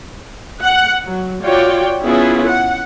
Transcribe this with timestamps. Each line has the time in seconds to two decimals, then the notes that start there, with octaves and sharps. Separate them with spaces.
0.62 F#5
1.05 F#3
1.43 F4 F#4 C#5 D5 G5
2.03 B3 C#4 E4 F4 G#4
2.48 F#5